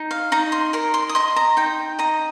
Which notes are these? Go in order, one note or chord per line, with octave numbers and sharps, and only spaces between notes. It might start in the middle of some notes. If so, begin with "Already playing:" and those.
Already playing: D#4
F5
D#4 A#5
C6
A#4 A#5
C6
D#6
D#5 C6
A#5
D#4 G5
D#5 A#5